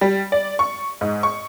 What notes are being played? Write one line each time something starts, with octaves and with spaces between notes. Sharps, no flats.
G3
D5
C#6
G#2
C#6